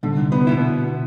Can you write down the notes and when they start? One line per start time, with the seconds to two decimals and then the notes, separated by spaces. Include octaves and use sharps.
0.03 C2 D3
0.32 B3
0.47 B2 B3 E4